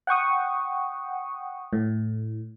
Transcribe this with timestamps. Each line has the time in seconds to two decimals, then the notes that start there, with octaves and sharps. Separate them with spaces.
0.07 F#5 G5 C#6 D#6
1.73 A2